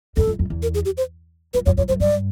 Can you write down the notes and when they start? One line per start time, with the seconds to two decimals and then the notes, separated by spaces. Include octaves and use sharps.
0.17 E2 A4
0.27 F2
0.39 F2
0.50 E2
0.62 A#4
0.74 G#4
0.85 G4
0.97 C5
1.54 F2 B4
1.66 F2 C#5
1.77 F2 C#5
1.88 F#2 C5
2.00 G2 D5